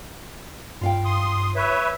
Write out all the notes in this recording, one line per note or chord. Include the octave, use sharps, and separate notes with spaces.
G2 F4 F5 G5
C6 D#6
B4 C#5 E5